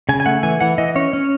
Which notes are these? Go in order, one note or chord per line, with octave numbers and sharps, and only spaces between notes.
C#3 G#5
G#5
A3 F#5
E3 G#5
E3 F#5
E3 D#5
C#4 C#5
C#4